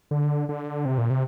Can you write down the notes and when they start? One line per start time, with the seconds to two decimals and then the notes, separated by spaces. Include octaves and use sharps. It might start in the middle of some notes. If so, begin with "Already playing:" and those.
0.11 D3
0.49 D3
0.85 C3
0.98 A#2
1.10 C3